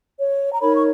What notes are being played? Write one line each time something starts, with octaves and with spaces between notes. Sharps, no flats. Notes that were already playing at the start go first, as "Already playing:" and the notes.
C#5
A#5
D#4 A#4 C#5 B5
C#6